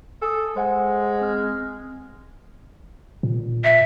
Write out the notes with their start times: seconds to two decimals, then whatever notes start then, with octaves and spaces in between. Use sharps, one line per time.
0.22 A4 G#5 D#6
0.56 G#3 C5 F#5 G#5
1.21 C4 F6
3.23 A#2
3.64 E5